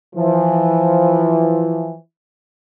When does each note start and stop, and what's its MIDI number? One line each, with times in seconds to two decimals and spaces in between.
0.16 1.94 52
0.16 1.94 53